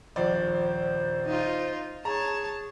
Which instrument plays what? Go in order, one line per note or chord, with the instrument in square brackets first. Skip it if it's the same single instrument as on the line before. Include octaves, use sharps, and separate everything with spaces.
[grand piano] D#1 A#1 D5 [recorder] C5
[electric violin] D#4 F4
[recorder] G#4 [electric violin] C#5 A5 [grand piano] A#5